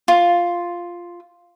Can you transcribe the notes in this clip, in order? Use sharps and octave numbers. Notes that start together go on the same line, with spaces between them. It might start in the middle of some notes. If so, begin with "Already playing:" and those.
F4